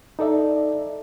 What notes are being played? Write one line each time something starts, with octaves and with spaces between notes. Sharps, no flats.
D#4 A4 D5 E5